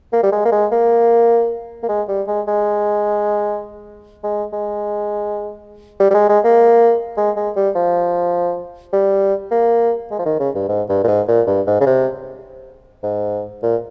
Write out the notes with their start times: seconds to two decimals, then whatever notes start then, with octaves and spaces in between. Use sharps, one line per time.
0.13 A#3
0.23 G3
0.32 G#3
0.45 A#3
0.52 G#3
0.72 A#3
1.83 A#3
1.89 G#3
2.08 G3
2.28 G#3
2.48 G#3
4.24 G#3
4.53 G#3
6.00 G3
6.11 G3
6.14 G#3
6.29 G#3
6.44 A#3
7.17 G#3
7.37 G#3
7.56 G3
7.75 F3
8.93 G3
9.51 A#3
10.11 G#3
10.19 F3
10.26 D#3
10.40 C#3
10.55 G2
10.69 G#2
10.89 G2
11.04 A#2
11.08 G#2
11.28 A#2
11.47 G2
11.67 G#2
11.81 C#3
11.86 C3
13.03 G#2
13.63 A#2